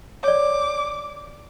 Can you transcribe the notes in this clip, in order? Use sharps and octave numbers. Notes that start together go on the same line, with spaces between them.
C#5 D5 D6